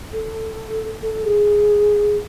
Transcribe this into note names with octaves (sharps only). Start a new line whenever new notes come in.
A4
A4
G#4